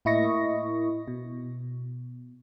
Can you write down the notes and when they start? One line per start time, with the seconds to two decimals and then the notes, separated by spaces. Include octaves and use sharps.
0.05 A2 A#3 E4 D#5 C#6 A#6
1.08 B2